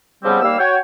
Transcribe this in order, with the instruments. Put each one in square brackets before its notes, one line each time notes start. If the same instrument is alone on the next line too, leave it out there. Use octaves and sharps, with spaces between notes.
[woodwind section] C#3 F3 G3 B3 C4 G4
D#2 G3 A#3 F5 E6
F#4 C#5 G5